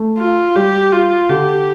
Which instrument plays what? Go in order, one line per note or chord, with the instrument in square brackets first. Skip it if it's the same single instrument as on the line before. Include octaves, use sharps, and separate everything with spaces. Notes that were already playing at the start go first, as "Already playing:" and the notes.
Already playing: [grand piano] A3
[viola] F4
[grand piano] G3 [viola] G4
[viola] F4
[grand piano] D3 [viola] G4